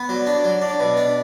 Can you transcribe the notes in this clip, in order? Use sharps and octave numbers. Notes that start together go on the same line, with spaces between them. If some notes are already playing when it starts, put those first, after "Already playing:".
Already playing: B3
F#3 D5
D4
F#3
D4 D5
B2
D4